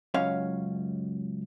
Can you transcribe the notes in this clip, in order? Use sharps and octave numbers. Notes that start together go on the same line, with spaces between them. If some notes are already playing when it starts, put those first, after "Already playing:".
C#2 F#2 C#4 C#5 F5